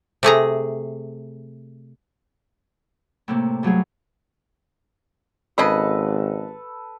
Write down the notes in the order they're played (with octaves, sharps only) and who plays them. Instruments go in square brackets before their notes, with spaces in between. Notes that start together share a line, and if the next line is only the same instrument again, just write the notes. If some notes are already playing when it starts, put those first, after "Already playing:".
[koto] C3 A3 G#4 A#5
[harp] A2 C3 A#3
G2 F#3 A3 G#4
[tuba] G#1 [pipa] C#3 D#5 B5 [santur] A4 B4